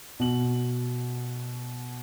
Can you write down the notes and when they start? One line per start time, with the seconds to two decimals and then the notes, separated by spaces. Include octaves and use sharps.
0.19 B2 F#7